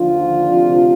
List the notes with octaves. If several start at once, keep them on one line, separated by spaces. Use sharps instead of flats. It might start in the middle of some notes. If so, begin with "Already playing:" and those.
Already playing: D#2 D3 F3 D4 F4
D2 C3 F3